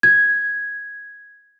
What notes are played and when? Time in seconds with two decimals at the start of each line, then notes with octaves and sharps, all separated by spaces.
0.03 G#6